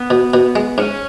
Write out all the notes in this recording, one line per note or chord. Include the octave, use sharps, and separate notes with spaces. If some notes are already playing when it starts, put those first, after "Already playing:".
Already playing: B3
B2
B2
G#3
G#2 C#4